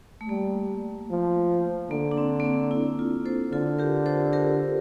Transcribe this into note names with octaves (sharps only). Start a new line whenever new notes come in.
A3
G3 A#3
F3
D3 A#3
D4
C4
A#3
C4
E4
F4
A4 C5
D3 F4 A4
G4 A#4
A4 C5
G4 A#4